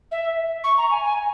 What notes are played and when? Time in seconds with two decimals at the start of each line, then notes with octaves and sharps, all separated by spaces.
0.11 E5
0.64 C#6
0.77 A#5
0.90 G#5
1.04 G#5